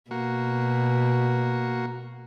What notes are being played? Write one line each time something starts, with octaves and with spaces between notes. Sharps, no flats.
B2 A#3 F#4